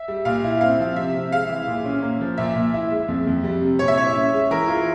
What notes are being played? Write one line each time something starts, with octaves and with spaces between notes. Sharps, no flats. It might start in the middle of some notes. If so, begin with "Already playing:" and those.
Already playing: E5
G3
A#2 F5
E4
C4 F5
F3
C3 E5
C4
G#3 F5
E3
A#2
C#4
A#3
F3
A#2 E5
A#2
E4
G#3
F2
F2
G3
C3
A#2 C#5
E5
E4 C#5
C#4
G#3
E3 A#4
F4